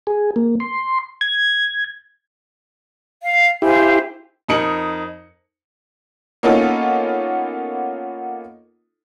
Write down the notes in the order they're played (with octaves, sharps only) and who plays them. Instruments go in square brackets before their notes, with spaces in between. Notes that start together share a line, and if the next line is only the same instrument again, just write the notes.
[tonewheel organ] G#4
A#3
C6
G#6
[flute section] F5
[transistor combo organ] E4 G4 [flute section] C5 F5 G#5
[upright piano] F2 D#4 A#4 C#7 F#7
[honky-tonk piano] A#3 B3 C#4 D#4 F4 A4